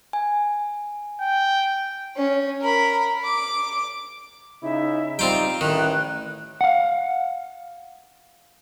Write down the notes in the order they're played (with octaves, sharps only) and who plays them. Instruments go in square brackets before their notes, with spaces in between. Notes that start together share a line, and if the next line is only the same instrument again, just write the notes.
[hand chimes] G#5
[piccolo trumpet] G5
[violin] C#4
A#4 B5
D6
[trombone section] C#3 D#4 E4 [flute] E5
[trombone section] G3 D#4 [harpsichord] C4 F4 G5
[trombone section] A1 [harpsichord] D#3 [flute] F#6
[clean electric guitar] F5 F#5